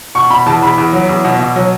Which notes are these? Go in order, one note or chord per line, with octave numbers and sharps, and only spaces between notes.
B2 C#6
B2 B5
E2 A5
E2 B5
E2
F#3
E2
B2
B2
F#3